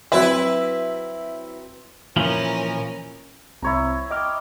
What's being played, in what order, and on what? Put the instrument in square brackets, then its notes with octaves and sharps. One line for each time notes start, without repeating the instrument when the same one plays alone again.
[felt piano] F#3 C4 E5 [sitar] E4 B4
[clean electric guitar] A#2 E3 F3 [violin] C#4 A#4
[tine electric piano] C2 C4 [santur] E4 C#5 A#5
[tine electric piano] D#5 D6 F6 [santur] G5